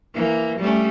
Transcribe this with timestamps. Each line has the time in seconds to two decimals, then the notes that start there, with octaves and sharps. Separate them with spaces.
0.14 E3 A#3
0.59 G3 A3 C#4